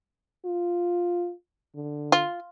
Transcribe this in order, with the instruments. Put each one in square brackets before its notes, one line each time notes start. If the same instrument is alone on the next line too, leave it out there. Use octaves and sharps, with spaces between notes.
[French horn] F4
D3
[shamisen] F4